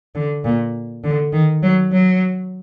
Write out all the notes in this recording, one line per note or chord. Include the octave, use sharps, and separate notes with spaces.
D3
A#2
D3
D#3
F#3
F#3